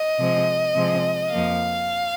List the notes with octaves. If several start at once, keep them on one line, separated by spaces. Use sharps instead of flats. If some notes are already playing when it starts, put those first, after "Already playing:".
Already playing: D#5
C3 F3 G#3 C4
C3 F3 G#3 C4
F2 F3 A#3 F5